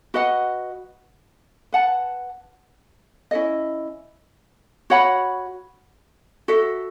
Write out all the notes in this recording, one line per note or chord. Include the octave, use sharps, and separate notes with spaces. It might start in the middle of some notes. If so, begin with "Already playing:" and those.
F#4 B4 D#5 F#5
B4 F#5 A5
C#4 E4 A4 D#5
F#4 C#5 F#5 B5
F#4 A4 E5